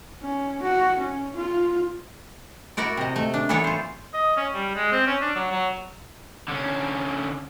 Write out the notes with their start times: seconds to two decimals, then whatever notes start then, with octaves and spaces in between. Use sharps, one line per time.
0.21 C#4
0.62 F#4
0.99 C#4
1.36 F4
2.77 E4 F#4 A#4 D5
2.97 C3 D#5
3.16 A3
3.34 D4
3.49 E3 F#3 B3 E4 A4 C#5
3.64 F4 C5
4.14 D#5
4.37 C#4
4.54 G3
4.75 G#3
4.92 C4
5.07 C#4
5.22 D4
5.36 F#3
5.51 F#3
6.48 D3 C#4